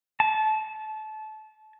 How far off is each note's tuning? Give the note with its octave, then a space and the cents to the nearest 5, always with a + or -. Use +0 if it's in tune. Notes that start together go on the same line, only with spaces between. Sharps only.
A5 -25